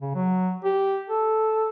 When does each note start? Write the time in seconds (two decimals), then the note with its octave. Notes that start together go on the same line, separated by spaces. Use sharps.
0.01 C#3
0.15 F#3
0.64 G4
1.10 A4